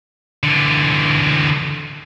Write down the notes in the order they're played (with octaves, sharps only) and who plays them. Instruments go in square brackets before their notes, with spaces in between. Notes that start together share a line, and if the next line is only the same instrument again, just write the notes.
[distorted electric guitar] D3 E3